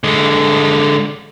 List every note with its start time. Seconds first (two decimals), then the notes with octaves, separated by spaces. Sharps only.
0.04 D3 G#3